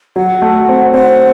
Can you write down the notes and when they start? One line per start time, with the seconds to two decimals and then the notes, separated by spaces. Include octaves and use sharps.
0.16 F#3 F#5
0.42 A3
0.69 C4
0.94 C4 F#5